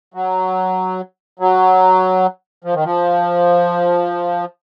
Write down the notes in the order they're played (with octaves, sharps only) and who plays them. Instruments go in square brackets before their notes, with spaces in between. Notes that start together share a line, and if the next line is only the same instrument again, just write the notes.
[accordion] F#3
F#3
F3
D#3
F3